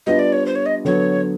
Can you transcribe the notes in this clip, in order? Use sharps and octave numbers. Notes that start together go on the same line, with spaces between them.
G3 B3 D4 F4 D#5
D5
C#5
C5
C#5
D#5
D3 F#3 B3 C#5